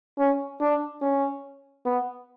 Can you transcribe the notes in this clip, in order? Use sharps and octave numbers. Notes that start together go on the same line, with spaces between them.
C#4
D4
C#4
B3